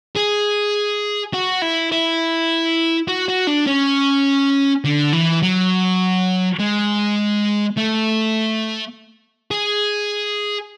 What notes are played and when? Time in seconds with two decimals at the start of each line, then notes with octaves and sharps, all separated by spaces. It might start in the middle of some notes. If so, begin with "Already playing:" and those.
0.16 G#4
1.33 F#4
1.62 E4
1.92 E4
3.08 F#4
3.28 F#4
3.47 D4
3.66 C#4
4.85 D3
5.13 E3
5.42 F#3
6.59 G#3
7.77 A3
9.51 G#4